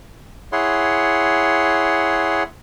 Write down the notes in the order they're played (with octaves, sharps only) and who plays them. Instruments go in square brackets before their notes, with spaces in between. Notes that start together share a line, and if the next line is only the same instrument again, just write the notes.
[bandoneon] E4 G#4 C#5 F#5 C6